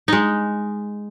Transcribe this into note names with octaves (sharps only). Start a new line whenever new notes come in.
G#3 D#4